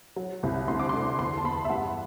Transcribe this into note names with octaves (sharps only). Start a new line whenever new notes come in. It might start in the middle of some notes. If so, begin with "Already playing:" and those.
F#3
C2
D2 C6
D6
D3 C6
E2 C6
A5
E2 B5
E5
G2 F#5